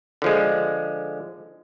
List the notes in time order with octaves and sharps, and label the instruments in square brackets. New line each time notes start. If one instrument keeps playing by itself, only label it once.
[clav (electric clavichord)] D3 F3 G#3